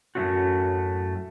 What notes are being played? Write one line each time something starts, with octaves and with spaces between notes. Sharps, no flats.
F#2 A2 G#3 A3 C#4 F#4